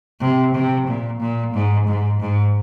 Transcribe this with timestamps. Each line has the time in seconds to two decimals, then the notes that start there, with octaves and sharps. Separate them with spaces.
0.20 C3
0.54 C3
0.87 A#2
1.20 A#2
1.54 G#2
1.87 G#2
2.20 G#2